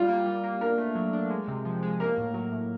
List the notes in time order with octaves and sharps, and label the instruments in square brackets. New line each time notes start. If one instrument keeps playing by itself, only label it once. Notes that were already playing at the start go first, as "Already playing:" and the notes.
Already playing: [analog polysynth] G3 [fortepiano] F4
[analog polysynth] A#3
G3
A#3
[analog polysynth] D4 [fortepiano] A#4
[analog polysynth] A3
F#3
D4
G#3
C3
F3
G#3
[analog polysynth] A#3 [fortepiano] A#4
[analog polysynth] A2
F#3
A2